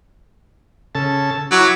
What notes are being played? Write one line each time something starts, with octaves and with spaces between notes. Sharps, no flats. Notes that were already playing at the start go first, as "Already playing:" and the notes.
C#3 A4 A5
F#3 E4 B5 D6